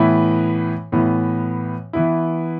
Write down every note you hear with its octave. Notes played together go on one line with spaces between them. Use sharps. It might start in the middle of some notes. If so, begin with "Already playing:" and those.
Already playing: A2 E3 B3 E4
A2 E3 B3
E3 B3 E4